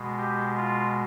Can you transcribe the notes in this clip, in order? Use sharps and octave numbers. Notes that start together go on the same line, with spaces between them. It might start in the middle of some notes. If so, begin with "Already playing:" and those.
Already playing: B2 G#3
G4
F4